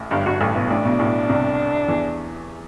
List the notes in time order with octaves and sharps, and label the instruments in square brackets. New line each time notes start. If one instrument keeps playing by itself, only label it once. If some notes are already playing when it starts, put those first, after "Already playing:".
Already playing: [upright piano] A1 A2
[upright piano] G1 G2 [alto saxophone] G4
[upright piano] G1 G2 [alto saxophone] F#4
[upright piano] A1 A2 [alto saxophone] A3
[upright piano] B1 B2 [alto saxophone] B3
[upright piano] A1 A2 [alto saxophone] D4
[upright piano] B1 B2
A1 A2
C2 C3
E2 E3